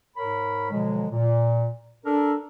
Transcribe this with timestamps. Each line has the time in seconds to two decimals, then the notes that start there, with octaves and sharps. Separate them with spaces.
0.16 G#2 A#4 C#5 B5
0.71 B2 D3 F3 F#3 G#3
1.11 A#2
2.05 D4 A4 A#4